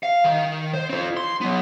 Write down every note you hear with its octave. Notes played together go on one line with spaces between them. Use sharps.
F5
D#3
C5
C4 F4
C6
F#3 B3